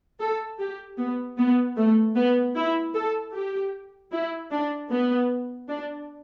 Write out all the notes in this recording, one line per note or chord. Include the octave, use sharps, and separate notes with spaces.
A4
G4
B3
B3
A3
B3
E4
A4
G4
E4
D4
B3
D4